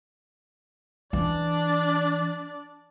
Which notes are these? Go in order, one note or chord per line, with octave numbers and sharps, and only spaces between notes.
E3 D4 D5